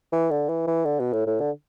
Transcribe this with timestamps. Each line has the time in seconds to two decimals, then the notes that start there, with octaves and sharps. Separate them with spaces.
0.12 E3
0.31 D3
0.49 E3
0.67 E3
0.85 D3
1.00 B2
1.13 A2
1.27 A2
1.40 D3